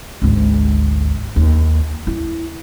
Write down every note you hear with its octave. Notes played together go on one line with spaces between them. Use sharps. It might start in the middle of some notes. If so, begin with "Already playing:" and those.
G#1 D2
D#2
E4